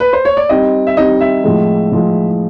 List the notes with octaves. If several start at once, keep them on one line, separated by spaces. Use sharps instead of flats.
B4
C5
C#5
D5
G3 C4 D#4 D#5
E5
G3 C4 D#4 D#5
E5
A2 F3 G#3
A2 F3 G#3